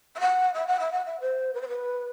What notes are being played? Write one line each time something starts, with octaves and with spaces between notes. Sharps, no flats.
E5
F#5
E5
F#5
E5
F#5
E5
C5
B4
C5
B4